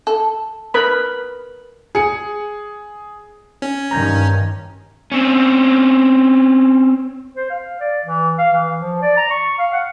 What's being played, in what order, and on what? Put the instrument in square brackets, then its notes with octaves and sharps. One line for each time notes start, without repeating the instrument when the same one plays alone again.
[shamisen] A4
[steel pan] A#4 B4 B5
[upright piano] G#4 C#7
[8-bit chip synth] C#4
[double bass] G2 D#3 [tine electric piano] A#5 G6 G#6
[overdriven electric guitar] C4 C#4
[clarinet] C5
F5
D5
E3
F5
E3
F3
D5
A#5
C#6
F5
F#5